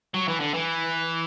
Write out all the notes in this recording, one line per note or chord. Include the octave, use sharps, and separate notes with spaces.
F#3
E3
D3
E3